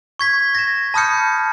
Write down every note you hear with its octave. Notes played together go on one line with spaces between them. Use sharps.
C#6 G#6 B6
A#6 E7
A5 B5 D#6 F6 G6 C#7